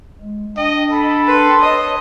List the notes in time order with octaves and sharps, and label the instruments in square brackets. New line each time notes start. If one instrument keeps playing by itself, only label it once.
[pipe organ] G#3
[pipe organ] D4 G5 [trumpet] D#5
[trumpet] A4 [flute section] B5
[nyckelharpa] B4 [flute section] C6
[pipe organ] B4 C#5 A5 [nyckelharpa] D#5